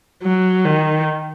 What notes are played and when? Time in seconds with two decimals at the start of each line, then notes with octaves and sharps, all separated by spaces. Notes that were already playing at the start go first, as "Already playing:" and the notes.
0.23 F#3
0.65 D#3